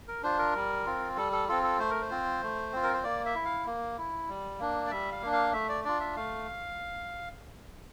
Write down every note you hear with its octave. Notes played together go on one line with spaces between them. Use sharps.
A#4
D4 F4 C5
A#4
G3
C4 F4
G3 A4
A4
C4 F4 A4
A4
A3 C5
A#4
C5
C4 F4
A3
C4 F4
A#4
C5
A#3 D5
E5
E4
F5
A#3
E4
G3
A#3 D4
D5
G3 E5
F5
A#3 D4
F5
A3 E5
D5
D4 F4 D5
E5
A3 F5